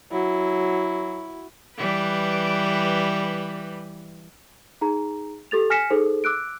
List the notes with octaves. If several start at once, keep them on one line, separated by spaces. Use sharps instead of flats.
F#3 E4
E3 G3 B4
D#4 G#4 A#5
G4 A4 A6 F7
G#5 F6 A#6 B6 C#7 E7
D#4 G#4 A4 C5
D6 E6 F#6 D7